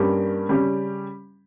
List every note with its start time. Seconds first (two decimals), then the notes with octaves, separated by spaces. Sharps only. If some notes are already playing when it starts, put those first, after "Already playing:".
Already playing: G2 G3 A#3 C#4 G4
0.49 C#3 G3 C#4 G4